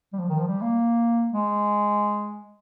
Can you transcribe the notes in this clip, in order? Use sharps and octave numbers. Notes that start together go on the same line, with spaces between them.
G3
F3
D#3
F3
G3
A#3
G#3